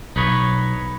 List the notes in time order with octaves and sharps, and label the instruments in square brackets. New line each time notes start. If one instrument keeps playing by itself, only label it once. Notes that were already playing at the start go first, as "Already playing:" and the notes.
[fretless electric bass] B1 [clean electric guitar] D#4 B4 C#5